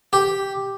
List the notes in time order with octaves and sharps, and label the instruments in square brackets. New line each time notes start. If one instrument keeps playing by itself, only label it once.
[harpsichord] G4